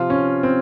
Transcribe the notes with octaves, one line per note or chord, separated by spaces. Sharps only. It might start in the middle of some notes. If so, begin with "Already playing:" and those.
Already playing: C3 F3 F4
C#4
C4